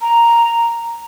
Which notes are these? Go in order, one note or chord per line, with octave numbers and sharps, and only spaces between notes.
A#5